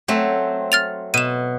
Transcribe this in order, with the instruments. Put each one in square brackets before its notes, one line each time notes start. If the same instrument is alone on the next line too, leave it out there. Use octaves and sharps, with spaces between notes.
[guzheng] F#3 A3 C4
[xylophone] F6 A6 F7
[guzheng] B2 [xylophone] D#7 E7